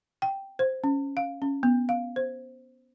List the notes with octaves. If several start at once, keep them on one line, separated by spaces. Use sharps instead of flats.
G5
C5
C#4
F5
C#4
B3
F5
C5